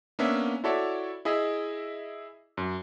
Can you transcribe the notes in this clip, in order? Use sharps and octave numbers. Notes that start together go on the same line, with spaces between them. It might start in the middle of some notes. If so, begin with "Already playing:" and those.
A#3 B3 C#4 D4 E5
E4 F#4 A4 C#5 D5 E5
E4 G#4 D#5 E5
F#2